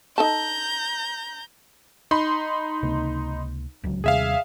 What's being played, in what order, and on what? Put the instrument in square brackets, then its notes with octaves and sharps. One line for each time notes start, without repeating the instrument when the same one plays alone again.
[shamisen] D#4 A4 A5 [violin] A#5 G6
[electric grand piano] D#4 B5 C6
[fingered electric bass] C#2 C3 A#3
D1 C#2 F#3
[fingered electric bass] D#2 C3 G3 [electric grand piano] G#4 E5 F5